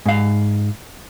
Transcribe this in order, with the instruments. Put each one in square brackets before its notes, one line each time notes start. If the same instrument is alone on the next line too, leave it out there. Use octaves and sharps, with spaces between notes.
[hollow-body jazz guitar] G#2 F5